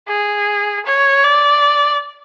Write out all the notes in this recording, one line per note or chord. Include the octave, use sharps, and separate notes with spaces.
G#4
C#5
D5